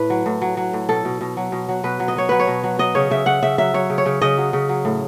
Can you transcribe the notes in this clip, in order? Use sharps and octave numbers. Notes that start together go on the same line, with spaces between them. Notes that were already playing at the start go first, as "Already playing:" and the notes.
Already playing: A2 B4
F#3
A2
F#3
F#3
A2
B2 A4
B2
B2
F#3
B2
F#3
B2 B4
F#3
D#5
F#3 C#5
F#3 B4
C#5
B2
F#3
F#3 D#5
C#3 C#5
C#3 E5
C#3 F#5
C#3 E5
F#3 E5
F#3 C#5
C#3
C#5
C#3
C#3 D#5
F#3
C#3
F#3
A2